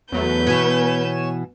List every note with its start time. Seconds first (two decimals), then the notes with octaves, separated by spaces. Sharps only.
0.12 E2 F#3 A3 B3 B4 G6
0.47 B2 E3 C#5 G#5 E7